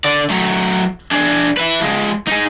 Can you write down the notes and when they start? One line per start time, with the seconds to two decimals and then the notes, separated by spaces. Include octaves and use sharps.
0.04 D3 D5
0.30 F#3 A3
1.11 D4 G#4
1.57 B4 E5
1.80 F3 G#3
2.28 D#4 G#4